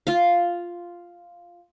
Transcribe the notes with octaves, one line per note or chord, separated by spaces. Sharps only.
F4 F5